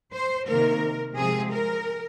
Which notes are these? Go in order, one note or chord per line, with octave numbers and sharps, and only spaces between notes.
C5
C3 D#3 A#3 A#4
C3 F3 G#3 C4 G#4
A#4